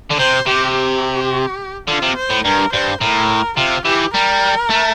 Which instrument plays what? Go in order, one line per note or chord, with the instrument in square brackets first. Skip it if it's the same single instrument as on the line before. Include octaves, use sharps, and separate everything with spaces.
[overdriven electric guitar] D3
[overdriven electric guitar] C3 [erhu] C5
[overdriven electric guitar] C3 [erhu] G4
[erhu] G4
[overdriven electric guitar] D3 [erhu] F4
[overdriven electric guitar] C3
[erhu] C5
[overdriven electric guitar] A2
[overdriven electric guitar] G2 [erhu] A#4
[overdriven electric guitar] G2 [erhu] C5
[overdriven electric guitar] A2 [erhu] A#4
[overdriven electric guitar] C3 [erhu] F4
[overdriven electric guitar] E3 [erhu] G4
[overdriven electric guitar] G3 [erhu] A#4
[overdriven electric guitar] A3